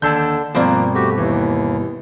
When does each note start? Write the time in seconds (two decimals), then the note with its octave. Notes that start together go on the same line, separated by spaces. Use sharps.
0.02 D#2 D3 D4 A4 A5 E6 G6
0.55 G2 B2 F3 A#3 C4 A#4 D5
0.95 A3 F#4 G4
1.18 D#2 E3